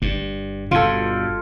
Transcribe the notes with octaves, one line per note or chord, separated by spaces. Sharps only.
G1 G2
G2 B2 F4 A4